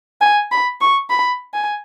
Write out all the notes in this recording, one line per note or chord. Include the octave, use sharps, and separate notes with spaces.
G#5
B5
C#6
B5
G#5